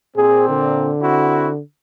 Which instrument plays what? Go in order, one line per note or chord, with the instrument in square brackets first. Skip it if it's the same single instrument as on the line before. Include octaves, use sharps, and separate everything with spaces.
[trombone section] A#2 C4 [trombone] G#4
[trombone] D3
[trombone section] C4 E4 F#4